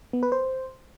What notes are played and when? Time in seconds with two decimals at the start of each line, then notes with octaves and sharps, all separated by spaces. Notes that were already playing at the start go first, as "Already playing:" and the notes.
0.13 B3
0.23 B4
0.32 C5